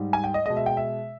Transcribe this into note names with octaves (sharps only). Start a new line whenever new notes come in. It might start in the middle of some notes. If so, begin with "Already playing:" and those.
Already playing: G#2 G3
G#5
G5
D#5
B2 G#3 D#5
E5
G5
E5